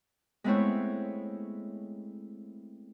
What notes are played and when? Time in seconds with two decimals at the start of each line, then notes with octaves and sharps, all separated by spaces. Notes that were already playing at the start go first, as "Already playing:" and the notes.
0.44 G#3 A3 B3 C4 E4 C#5